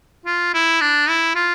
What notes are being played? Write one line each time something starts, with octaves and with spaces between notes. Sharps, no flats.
F4
E4
D4
E4
F4